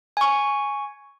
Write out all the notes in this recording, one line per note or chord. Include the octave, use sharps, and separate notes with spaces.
G#5 C#6